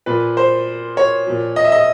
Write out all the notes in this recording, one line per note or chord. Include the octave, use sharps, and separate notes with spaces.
A#2 F3 B4
C5
C#5
A#2 F3
D#5
E5
D#5